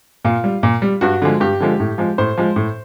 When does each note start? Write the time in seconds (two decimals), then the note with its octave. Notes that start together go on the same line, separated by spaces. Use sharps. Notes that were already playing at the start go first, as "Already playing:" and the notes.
0.25 A#2 F4
0.44 G3
0.63 A#2
0.82 G3
1.01 G2 F#4
1.22 D3 F3 G#3
1.40 G2 G4
1.60 D3 F3 G#3
1.80 A2
1.98 F3 G#3
2.18 A2 C5
2.38 F3 G#3
2.56 A2